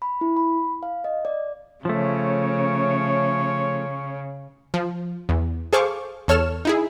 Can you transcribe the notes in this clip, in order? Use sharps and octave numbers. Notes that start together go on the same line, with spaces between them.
B5
E4
B5
F5
D#5
D5
C#3 F3 A3 C#5
F3
E2
G#4 A4 C5 F5 C#6 D6
E2 A4 C#5 F6 E7
D#4 E4 G#4